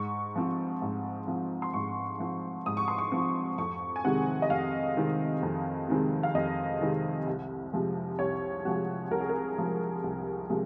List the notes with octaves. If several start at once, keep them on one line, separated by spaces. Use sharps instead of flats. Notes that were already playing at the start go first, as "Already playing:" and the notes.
Already playing: G#2 C#6
F3 C4
G#2
F3 C4
C6
G#2 C#6
F3 C4
G#2 D#6
C#6
C6
C#6
F3 C4
F2 C#6
G#5
C3 D#3 G#3 C4 F#5
D#5
F2 F5
C3 D#3 G#3 C4
F2
C3 D#3 G#3 C4
F5
F2 D#5
C3 D#3 G#3 C4
C2
C3 F3 G#3
C2 C#5
C3 F3 G#3 F#4
C2 A#4
G#4
A#4
C3 F3 G#3
C2
C3 F3 G#3